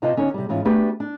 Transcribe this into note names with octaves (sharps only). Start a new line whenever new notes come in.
C3 F4 B4 D#5 A5
D3 C#4 D#4 C#5
C3 G3
G#2 E3 C#4 F4
A3 B3 D4 F#4 G4 B4
D4